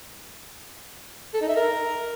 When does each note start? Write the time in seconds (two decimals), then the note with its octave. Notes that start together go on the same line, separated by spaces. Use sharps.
1.34 A4
1.41 D#4
1.49 E5
1.56 A#4